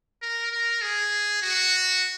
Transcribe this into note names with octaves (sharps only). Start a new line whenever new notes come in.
A#4
A#4
G#4
F#4